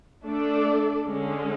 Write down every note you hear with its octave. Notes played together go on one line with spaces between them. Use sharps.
A3 D4 A4 D5
D3 G#3 C#4